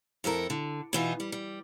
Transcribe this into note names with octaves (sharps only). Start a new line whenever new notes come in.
F2 E4 A4 A#4
D3
B2 E3 D#4 F4
G3
G3